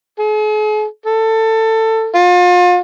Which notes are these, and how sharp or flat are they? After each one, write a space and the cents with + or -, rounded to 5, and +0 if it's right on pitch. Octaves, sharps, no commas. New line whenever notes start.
G#4 +45
A4 +20
F4 +35